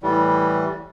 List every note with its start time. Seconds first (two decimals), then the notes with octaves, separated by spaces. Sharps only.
0.03 A2 E3 G3